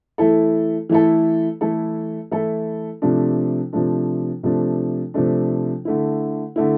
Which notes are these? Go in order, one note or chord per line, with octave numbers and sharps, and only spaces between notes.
E3 A3 E4 A4
E3 A3 E4 A4
E3 A3 E4 A4
E3 A3 E4 A4
C3 F3 A3 D4
C3 F3 A3 D4
C3 F3 A3 D4
C3 F3 A3 D4
D3 A3 E4
D3 A3 E4